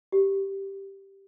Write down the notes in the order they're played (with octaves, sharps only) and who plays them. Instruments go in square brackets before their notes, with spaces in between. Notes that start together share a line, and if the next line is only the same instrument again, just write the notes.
[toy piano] G4